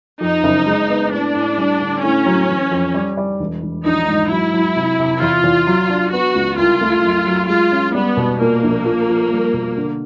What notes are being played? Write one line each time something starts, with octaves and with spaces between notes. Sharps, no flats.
F2 D#4
F#1
G#3
B3
A2 D4
A2
G3
D3
A2 C#4
F#3
E3
F2
G3
G3
E1
E1
A#1 D#4
G#2
F#3 E4
F#3
C3
C3
E2 F4
E2
F#3
D4
B3 F#4
C#2
C2 F4
A3
F#2
F#3
G#3 F4
C#4
G3 B3
B2
A#2 A#3
A#1
F3
F3
G3
B2
D3